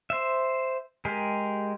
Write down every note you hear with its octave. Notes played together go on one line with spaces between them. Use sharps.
C5 E5
G#3 G4 G#4 A#4